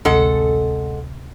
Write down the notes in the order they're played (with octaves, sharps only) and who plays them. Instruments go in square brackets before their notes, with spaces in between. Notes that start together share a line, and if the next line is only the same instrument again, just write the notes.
[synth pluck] A1 D2 C3 [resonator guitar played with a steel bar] G#3 A4 F#5